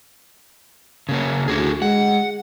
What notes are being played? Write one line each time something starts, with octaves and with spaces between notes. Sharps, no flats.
C#3 A#3 C#4
D2 E4 F#4 G#4
G#3 F#5